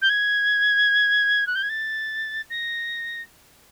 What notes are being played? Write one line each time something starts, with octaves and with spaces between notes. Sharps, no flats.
G6
G#6
F#6
G6
G#6
A6
A#6